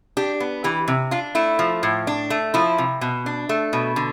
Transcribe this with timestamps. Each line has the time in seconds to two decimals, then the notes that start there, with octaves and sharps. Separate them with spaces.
0.17 D4 G4
0.40 B3
0.64 E3 G4
0.88 C3
1.11 D4 F4
1.35 A3 E4
1.59 F3
1.83 A2
2.07 D4
2.30 A3
2.54 F3 E4
2.78 C3
3.01 B2
3.26 D4
3.49 A3
3.73 B2
3.96 D3